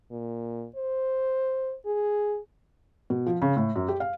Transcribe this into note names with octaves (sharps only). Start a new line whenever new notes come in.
A#2
C5
G#4
B2
F3
C#3
A2
F#2
G4
F5